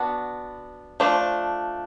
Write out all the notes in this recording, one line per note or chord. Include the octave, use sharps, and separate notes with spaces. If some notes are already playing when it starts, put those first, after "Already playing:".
Already playing: B3 D4 F#4
F3 A3 D4